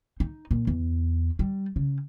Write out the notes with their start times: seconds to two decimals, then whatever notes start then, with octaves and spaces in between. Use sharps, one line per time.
0.20 D#4
0.51 A#2
0.67 E2
1.39 G3
1.76 C#3